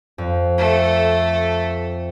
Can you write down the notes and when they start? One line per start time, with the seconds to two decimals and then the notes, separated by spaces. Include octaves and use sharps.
0.18 F2
0.58 A3 A4